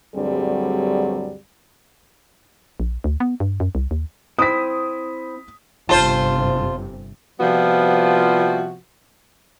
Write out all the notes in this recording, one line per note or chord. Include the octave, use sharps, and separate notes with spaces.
D2 G2 F#3 G3 C4 G#4
A#1
D2
B3
G2
F#2
C2
D#2
C4 E4 C5 D#6 B6
G1 C3 F4 C5 A5
C3 F3 G3 B3 F4 F#4